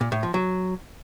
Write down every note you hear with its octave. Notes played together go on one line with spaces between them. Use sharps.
A#2
A2
F3
F#3